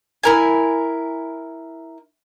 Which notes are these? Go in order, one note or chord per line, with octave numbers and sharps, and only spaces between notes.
E4 A#4 G#5